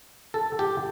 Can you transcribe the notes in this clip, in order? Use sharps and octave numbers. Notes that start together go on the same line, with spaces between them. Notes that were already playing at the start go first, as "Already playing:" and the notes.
A4
G4